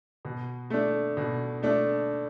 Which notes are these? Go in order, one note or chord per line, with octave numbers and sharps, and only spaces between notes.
B2
A3 D4
B2
A3 D4